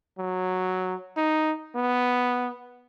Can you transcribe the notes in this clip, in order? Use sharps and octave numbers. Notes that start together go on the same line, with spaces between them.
F#3
D#4
B3